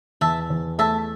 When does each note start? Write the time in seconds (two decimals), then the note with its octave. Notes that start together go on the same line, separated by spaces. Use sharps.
0.21 E2 E5 A5
0.50 E2
0.78 A3 E5 A5